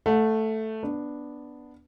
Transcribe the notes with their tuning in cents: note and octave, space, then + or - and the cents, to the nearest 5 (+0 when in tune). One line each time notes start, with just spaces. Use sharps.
A3 +0 F#5 -35
B3 +0 D4 +0